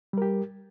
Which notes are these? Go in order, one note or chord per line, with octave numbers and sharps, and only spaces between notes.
G3 G4 A#4